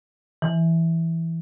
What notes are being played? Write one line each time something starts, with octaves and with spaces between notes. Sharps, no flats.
E3